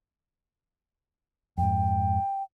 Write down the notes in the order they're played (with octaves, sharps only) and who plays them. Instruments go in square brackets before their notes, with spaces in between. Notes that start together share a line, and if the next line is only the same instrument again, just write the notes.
[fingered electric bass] F2 G#2 [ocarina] G5